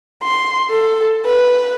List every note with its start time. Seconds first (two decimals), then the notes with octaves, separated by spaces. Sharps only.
0.23 C6
0.71 A4
1.26 B4